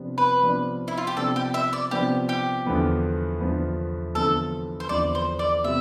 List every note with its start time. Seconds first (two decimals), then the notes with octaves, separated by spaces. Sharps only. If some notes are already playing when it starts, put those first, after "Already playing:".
Already playing: C3 F3 B3 D4
0.18 B4
0.42 C3 F3 B3 D4
0.88 E4
0.98 F4
1.07 G4
1.17 C3 F3 B3 D4 A4
1.36 G4
1.54 E5
1.73 D5
1.91 C3 F3 B3 D4 G4
2.29 G4
2.66 E2 D3 F3 B3
3.40 E2 D3 F3 B3
4.15 E2 D3 F3 B3 A4
4.80 C5
4.89 E2 D3 F3 B3 D5
5.15 C5
5.39 D5
5.64 C3 G3 B3 E5